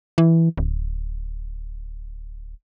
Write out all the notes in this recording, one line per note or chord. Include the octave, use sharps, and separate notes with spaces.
E3
D1